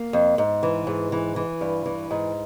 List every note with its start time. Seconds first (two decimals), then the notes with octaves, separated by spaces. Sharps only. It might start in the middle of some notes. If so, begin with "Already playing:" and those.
Already playing: A#3
0.13 F2
0.38 G#2
0.63 E3
0.87 G#2
1.12 E3
1.36 E3
1.61 G2
1.86 E3
2.11 G#2